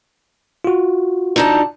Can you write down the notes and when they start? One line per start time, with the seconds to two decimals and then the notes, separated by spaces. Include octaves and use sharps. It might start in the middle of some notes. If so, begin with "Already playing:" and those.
0.65 F4 F#4
1.36 D3 D#4 A5